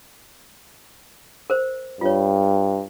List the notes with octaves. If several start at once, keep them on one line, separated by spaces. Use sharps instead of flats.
A#4 C5
G2 F4 C#5